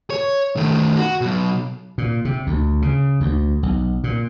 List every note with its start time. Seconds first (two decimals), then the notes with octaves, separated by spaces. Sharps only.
0.10 C#5
0.57 D#3 A3
0.97 F#4
1.21 B2 F#3
1.98 A#2
2.25 C3
2.47 D2
2.82 C#3
3.21 D2
3.63 B1
4.04 A#2